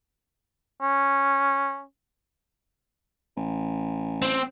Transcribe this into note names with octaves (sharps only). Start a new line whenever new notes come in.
C#4
A1
C4